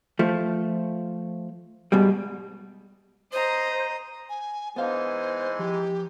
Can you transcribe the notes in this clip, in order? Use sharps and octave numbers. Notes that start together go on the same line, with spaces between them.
F3 A3
G#2 B2 G3
C5 D#5 A#5
G#5
E3 G#3 B3 D#4 C5 F5
F3 G4